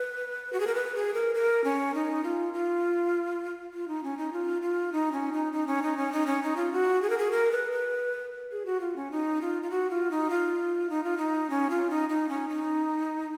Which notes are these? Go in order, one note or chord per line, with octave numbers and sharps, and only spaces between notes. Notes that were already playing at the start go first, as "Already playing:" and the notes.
Already playing: B4
F#4
G#4
A#4
B4
G#4
A#4
A#4
C#4
D#4
F4
F4
F4
D#4
C#4
D#4
F4
F4
D#4
C#4
D#4
D#4
C#4
D#4
C#4
D#4
C#4
D#4
F4
F#4
G#4
A#4
G#4
A#4
B4
B4
G#4
F#4
F4
C#4
D#4
F4
F4
F#4
F4
D#4
F4
D#4
F4
D#4
C#4
F4
D#4
D#4
C#4
D#4